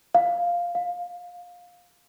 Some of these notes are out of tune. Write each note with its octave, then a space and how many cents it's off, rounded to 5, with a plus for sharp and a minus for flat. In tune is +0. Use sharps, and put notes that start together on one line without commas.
F5 +0
F5 +20